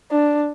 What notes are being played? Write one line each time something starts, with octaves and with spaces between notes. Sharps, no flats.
D4